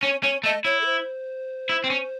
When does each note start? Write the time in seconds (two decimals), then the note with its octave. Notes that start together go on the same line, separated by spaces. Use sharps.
0.02 C#4 C#5
0.23 C#4 C#5
0.43 A3 D#5
0.65 E4 C#5
0.81 A4
0.86 C5
1.69 E4
1.84 C4
1.90 C#4